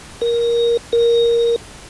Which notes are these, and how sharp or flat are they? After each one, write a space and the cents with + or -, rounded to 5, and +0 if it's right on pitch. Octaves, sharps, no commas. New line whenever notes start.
A#4 +10
A#4 +5